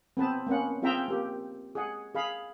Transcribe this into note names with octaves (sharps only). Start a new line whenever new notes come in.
B3 C4 B4 A5
A#3 B3 C#4 F#5
C4 F4 G#4 E5 G5 A#5
A#3 G4
G#4 F#5
G#4 F5 B5